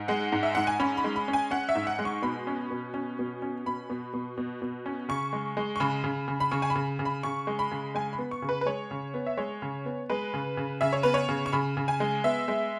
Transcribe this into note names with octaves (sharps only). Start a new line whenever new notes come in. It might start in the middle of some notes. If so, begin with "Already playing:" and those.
Already playing: G#2
G#3 F#5
G#2
E5
G#2 F#5
G#5
C#4 B5
B5
G#3
B5
C#4
G#5
C#4 F#5
E5
G#2
F#5
G#3
C#6
B2 B5
C#4
B2
C#4
B2
C#4
B2 B5
B2
B2
B2
B2
C#4
C#3 C#6
G#3
G#3
C#6
C#3 B5
C#3
C#3
B5
C#3 C#6
G#5
B5
C#3
C#3
B5
C#3 C#6
G#3
B5
C#3
G#3 G#5
B5
B3
C#6
C#3
B4
B4
G#3 C#5
C#3
B3
E5
G#3 C#5
C#3
B3
G#3 B4
C#3
C#3
C#3 E5
C#5
B3 B4
C#5
C#3
C#6
C#3 B5
C#3
G#5
G#3
B3 E5
G#3